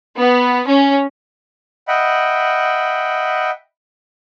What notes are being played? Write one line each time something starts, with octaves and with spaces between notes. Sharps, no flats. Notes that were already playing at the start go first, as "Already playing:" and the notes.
B3
C#4
D#5 E5 F#5 G5 B5